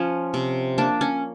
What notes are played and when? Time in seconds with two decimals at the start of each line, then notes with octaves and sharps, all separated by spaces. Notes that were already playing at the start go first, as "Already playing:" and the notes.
Already playing: F3 C#4
0.34 C3
0.78 A#3 D4
1.01 C#4